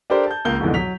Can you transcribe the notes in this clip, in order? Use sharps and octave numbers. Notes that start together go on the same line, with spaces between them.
D4 G4 A4 A#4 C5 D5
A5 G6
C#2 A#3 G6 G7
C2 F2 G#2 B2 D3 E3
F#3 B6 F7